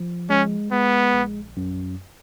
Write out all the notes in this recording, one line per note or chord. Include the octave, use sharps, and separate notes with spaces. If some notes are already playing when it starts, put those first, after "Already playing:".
Already playing: F3
G#3 C#4
G#3 B3
A#1
F#2